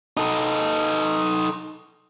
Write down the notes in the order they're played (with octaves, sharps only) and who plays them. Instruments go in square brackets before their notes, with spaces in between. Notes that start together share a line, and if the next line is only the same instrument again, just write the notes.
[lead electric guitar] D#4 A4